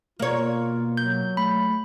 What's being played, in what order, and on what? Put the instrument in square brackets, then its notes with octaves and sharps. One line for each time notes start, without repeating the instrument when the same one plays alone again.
[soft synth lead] B2 [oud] A#3 C#5 [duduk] F4
[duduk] F#3 [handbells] G6
[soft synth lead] A3 [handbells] B5